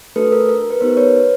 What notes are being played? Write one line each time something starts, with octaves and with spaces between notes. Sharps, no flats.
A3 D4 F#4 A4 B4
A#4
A#4
B4
B3 D#4 G4 A#4 C5
B4 C#5